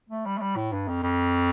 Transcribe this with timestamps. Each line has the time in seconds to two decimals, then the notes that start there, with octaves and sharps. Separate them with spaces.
0.09 A3
0.26 G3
0.37 A3
0.41 G3
0.56 A2
0.72 G2
0.88 F2
1.02 F2